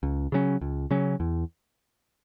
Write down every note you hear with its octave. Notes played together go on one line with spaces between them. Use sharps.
C#2
C#3 F#3 C#4
C#2
C#3 F#3 C#4
E2